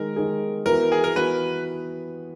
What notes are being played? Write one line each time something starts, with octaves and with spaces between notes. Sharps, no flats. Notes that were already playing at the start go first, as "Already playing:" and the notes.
Already playing: D#3 G#3 D#4 G#4 A#4
D#3 G#3 D#4 G#4
E3 B3 F#4 A#4
G#4
A#4
E3 B3 F#4 B4